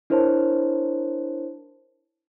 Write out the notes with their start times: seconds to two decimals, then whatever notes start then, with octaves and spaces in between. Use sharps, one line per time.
0.10 D4 E4 A#4 C5 C#5 A5